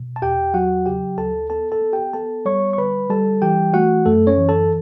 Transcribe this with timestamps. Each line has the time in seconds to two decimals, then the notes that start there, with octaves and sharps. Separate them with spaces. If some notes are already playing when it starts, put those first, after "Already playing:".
Already playing: B2
0.16 A5
0.22 E2 G4 G5
0.54 F#3 F#4 F#5
0.86 C#3 G4 G5
1.17 D2 A4 A5
1.50 B3 A4 A5
1.72 A4 A5
1.82 B3
1.93 G4 G5
2.13 B3 A4 A5
2.45 G3 C#5 C#6
2.73 C#6
2.78 D3 B4 B5
3.10 G3 A4 A5
3.42 E3 G4 G5
3.74 A3 F#4 F#5
4.05 F#2 A3 A4
4.27 C#4 C#5
4.38 E3
4.49 A4 A5